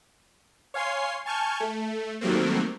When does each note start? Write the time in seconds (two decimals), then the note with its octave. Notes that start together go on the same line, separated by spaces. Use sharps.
0.74 C#5 F5 G#5 C6 C7
1.26 G#5 A5 C#6 F6 G6 G#6
1.60 A3
2.21 D#3 F#3 G3 A3 A#3 C4